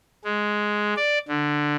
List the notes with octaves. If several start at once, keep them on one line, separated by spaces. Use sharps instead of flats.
G#3
D5
D3